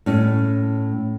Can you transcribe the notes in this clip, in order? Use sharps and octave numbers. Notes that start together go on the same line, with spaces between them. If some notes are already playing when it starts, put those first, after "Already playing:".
A2 C#4